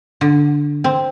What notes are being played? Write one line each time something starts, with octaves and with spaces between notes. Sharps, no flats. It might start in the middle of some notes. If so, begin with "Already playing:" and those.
D3
C4